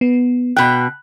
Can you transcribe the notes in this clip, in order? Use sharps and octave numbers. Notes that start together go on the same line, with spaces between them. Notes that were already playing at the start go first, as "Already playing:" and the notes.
B3
B2 G5 B5 F#6